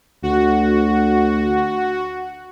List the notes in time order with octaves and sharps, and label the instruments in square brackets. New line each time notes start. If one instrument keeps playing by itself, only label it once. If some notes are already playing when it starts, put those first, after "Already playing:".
[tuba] D2 [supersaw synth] F#4